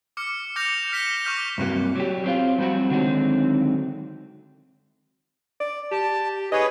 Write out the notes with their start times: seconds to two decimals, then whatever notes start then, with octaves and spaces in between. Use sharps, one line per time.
0.17 D6 F6 C#7
0.56 D6 F6 G6 A#6 C#7 F7
0.92 F6 B6 C#7 E7 G7
1.25 C#6 D6 F6 G6 A#6
1.58 G2 C3 F#3 A#3
1.96 F#3 G4
2.24 F#3 C4 F4
2.58 F3 G3 B3 C4 F#4
2.90 D3 D#3 F#3 G#3 C4 D#4
5.60 D5
5.92 G4 A5
6.52 G#4 B4 C#5 D#5